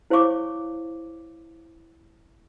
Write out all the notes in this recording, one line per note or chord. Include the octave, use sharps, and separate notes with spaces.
E4 C5 C#5 F5 C#6 D6